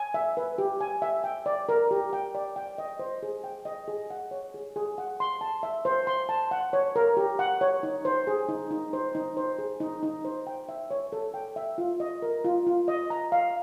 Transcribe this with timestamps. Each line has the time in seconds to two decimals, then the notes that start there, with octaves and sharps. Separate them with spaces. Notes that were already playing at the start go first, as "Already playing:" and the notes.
Already playing: G#5
0.14 E5
0.37 B4
0.58 G4
0.81 G#5
1.02 E5
1.24 G5
1.46 D5
1.69 A#4
1.91 G4
2.13 G5
2.35 D5
2.56 G5
2.78 D#5
2.99 C5
3.23 G#4
3.44 G5
3.65 D#5
3.88 G#4
4.10 F#5
4.31 C#5
4.54 G#4
4.76 G#4
4.98 F#5
5.20 C6
5.41 A5
5.63 E5
5.85 C5
6.07 C6
6.29 A5
6.51 F#5
6.73 C#5
6.96 A#4
7.17 G4
7.39 F#5
7.61 C#5
7.83 D#4
8.05 C5
8.27 G#4
8.49 D#4
8.71 D#4
8.93 C5
9.15 D#4
9.37 C5
9.59 G#4
9.80 D#4
10.03 D#4
10.25 C5
10.47 G5
10.69 E5
10.91 C#5
11.12 A4
11.34 G5
11.56 E5
11.78 F4
12.00 D#5
12.22 A#4
12.45 F4
12.67 F4
12.88 D#5
13.10 A#5
13.32 F5